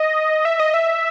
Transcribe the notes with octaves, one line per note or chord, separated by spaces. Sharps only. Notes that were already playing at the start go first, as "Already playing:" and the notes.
Already playing: D#5
E5
D#5
E5